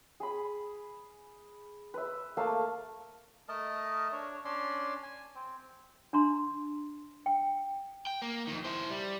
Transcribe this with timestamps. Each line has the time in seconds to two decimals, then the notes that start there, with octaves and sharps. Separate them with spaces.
0.20 G#4 B5
1.94 B4 E5
2.37 A3 A#3 F5 A5
3.49 A3 A#4 D#5 A5
4.12 D4 C#5
4.45 C#4 D4 D5 C6
5.03 G#5
5.35 C4
6.13 D4 A#5 C6
7.26 G5
8.07 G5
8.22 A#3
8.47 F2 D#3
8.64 E4 C5
8.90 G3